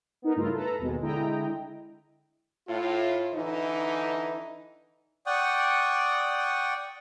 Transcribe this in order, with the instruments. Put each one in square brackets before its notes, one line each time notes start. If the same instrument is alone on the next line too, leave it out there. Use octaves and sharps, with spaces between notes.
[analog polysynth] B3 D#4 A#4
G2 C#3 A3 E4 F4 A#4
A4 B4 A#5
G#1 D#2 B2 G#3
D3 G#3 E4 D#5 G5 A#5
[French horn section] A2 F4
D3 E3 D#4
[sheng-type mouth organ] D5 F#5 G5 C#6 D#6